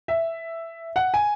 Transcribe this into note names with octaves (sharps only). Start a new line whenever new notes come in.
E5
F#5
G#5